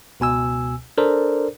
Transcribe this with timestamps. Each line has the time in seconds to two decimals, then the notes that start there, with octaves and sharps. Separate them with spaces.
0.20 C#2 B2 G#5 E6
0.98 D4 A4 A#4 C5 D5